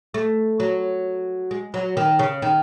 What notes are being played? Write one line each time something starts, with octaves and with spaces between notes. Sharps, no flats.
A3
F#3
G#3
F#3
D#3
C#3
D#3